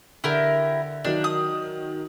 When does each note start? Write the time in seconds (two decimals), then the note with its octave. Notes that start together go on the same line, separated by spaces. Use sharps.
0.24 D3 E4 G4 A#4
1.04 D#3 F#3 D4
1.24 D#6